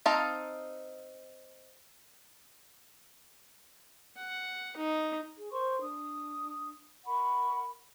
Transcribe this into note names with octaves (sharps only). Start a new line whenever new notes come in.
C4 D#4 F5 A5 A#5
F#5
D#4
G#4
A#4 C5 C6 C#6
D4 D#6
A#4 F#5 B5 C#6